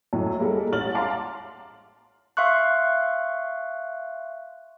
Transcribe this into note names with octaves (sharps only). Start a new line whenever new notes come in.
F#2 A2
G3 G#3 A#3 G4 A4
A1 F6 A6 F#7
F5 F#5 A5 A#5 C6 D6
E5 F5 C6 C#6 F#6